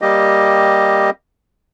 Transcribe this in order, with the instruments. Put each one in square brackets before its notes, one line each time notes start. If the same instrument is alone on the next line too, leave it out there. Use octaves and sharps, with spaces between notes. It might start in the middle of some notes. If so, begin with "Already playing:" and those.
[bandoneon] G3 A#3 G4 D#5